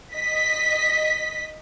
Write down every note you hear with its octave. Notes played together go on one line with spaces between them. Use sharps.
D#5 B6